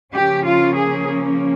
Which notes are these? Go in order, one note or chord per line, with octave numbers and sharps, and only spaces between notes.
C#3 F3 A#3 C#4 G4
F4
G#4